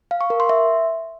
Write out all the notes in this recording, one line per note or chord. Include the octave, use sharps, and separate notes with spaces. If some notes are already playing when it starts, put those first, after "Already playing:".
F5
C#6
A#4
C6
E5